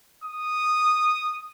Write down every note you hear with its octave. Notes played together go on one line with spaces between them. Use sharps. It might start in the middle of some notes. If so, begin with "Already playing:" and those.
D#6